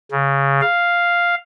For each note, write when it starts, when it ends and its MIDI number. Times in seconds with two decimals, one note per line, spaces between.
0.11 0.61 49
0.61 1.35 77